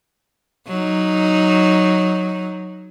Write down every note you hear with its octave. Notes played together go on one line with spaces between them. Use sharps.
F#3 D#4